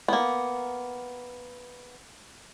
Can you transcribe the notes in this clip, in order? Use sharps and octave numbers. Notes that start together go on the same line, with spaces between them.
A#3 B3